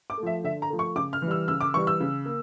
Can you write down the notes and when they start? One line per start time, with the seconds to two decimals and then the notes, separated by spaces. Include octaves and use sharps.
0.10 D6
0.18 A3
0.23 F3 E5
0.44 D3 E5
0.62 A#5
0.70 F3 A3
0.79 C#6
0.96 C#3 D6
1.13 F6
1.22 E3
1.27 G3 E6
1.48 C#3 E6
1.61 D6
1.74 E3 G3 C#6
1.87 E6
2.00 C#3
2.25 A#3